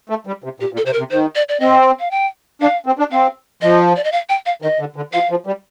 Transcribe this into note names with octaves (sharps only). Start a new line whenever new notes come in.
A3
G3
C3
A#2 G4
A#2
A4
C3 C5
A#4
C3
D#3 C5
D5
D5
C4 D#5
F5
G5
D4 F5
C4
D4
C4 F5
F3 D#5
D5
D#5
F5
G5
F5
D#3 D#5
D3
D3
F3 F5
F3
G3